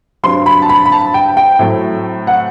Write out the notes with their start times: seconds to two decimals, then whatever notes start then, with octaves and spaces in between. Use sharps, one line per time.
0.23 G2 F#3 C4 C6
0.46 B5
0.62 A5
0.69 B5
0.86 B5
0.92 A5
1.14 G5
1.37 G5
1.59 A2 F#3 A3 C4
2.27 F#5